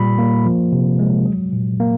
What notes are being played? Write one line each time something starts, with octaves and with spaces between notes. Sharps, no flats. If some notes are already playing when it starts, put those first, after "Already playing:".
Already playing: A#2 G3 B5
A#3
F3
C3
G#3
F#3
A#2
A#3